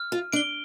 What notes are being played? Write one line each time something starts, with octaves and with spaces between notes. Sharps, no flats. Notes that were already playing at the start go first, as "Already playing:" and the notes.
Already playing: F6
F4
D4 D7 G7